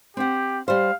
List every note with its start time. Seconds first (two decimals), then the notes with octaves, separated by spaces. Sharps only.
0.17 C4 G4 F#5
0.68 G3 C5 F5